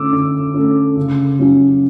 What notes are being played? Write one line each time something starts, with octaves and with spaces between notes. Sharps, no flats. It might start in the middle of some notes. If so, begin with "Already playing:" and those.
Already playing: D3 A3 C#4 D6 E6
D3
A3 C#4
C#3
F#3 C#4